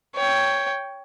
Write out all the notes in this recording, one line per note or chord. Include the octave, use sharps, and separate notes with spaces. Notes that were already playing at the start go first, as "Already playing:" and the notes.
C#5 G5